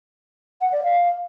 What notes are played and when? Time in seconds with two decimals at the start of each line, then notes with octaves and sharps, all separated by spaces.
0.61 F#5
0.72 D5
0.83 F5